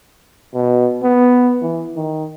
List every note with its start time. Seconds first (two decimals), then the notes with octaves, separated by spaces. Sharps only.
0.54 B2
1.03 B3
1.62 E3
1.96 D#3